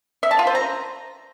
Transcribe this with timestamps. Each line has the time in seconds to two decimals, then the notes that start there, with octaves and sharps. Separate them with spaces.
0.23 E5
0.31 A5
0.39 F4
0.47 C5
0.55 A#5